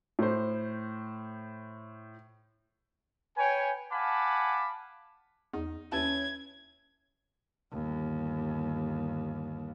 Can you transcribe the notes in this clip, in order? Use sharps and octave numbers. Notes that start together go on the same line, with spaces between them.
A2 C5
B4 C#5 G5 G#5
F5 F#5 G#5 A5 B5 D6
E2 D#4
D#2 C#4 E4 B4 A5 G#6
G1 D#2